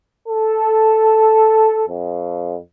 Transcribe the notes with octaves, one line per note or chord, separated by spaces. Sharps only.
A4
F2